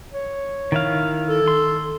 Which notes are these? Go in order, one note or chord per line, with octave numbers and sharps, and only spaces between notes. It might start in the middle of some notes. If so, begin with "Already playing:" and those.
C#5
D#3 E4 F5
A4
C6